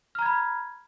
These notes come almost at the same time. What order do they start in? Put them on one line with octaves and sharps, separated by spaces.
F6 A#5 G#6 B5